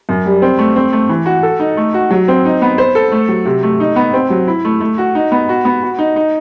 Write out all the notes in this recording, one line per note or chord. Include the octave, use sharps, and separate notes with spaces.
F#2
G3
C4
A3
C4
A3
E3
F#4
A4
D#4
A3
F#4
F#3
C4
D#4
B3
C5
A4
A3
F#3
C3
A3
D#4
B3
C4
F#3
E4
A3
A3
F#4
D#4
B3
F#4
B3
F#4
D#4
D#4